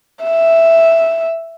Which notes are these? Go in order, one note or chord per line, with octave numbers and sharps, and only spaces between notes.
E5